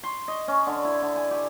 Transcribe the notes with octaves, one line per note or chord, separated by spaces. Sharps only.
C6
D#5
C#4
D3
E4
D3
G#5
G4